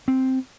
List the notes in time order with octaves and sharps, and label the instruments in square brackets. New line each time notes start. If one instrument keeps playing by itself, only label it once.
[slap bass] C4